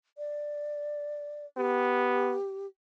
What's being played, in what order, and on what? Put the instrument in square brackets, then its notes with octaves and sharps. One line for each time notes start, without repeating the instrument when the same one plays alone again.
[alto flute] D5
[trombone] B3 [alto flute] G4